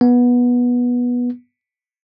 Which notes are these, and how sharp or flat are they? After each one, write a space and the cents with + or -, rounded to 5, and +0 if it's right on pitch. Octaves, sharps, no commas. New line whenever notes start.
B3 -15